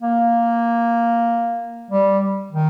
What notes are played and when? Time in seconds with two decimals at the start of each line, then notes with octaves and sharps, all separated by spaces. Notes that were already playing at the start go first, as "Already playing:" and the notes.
0.02 A#3
1.90 G3
2.52 D#3